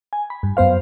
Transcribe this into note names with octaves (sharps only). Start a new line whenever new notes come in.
G#5
B5
G2
F#2 B3 C5 F5